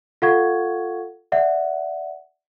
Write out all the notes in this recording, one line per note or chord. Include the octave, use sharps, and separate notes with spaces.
F4 A4 F5 F#5 C#6 G#6
D5 E5 F#5